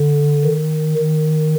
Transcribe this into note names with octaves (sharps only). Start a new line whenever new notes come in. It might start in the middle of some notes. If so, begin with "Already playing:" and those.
Already playing: D3
D#3
D#3